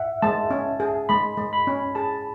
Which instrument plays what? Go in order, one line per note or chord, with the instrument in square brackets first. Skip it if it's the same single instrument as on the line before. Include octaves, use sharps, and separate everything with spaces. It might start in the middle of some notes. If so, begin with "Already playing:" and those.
Already playing: [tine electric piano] E5 F#5
[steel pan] G#3 [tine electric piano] A5
[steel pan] C#4
G#4
[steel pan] G#3 [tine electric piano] B5
[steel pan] G#3
[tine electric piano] B5
[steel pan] C#4
[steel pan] G#4 [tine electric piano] A5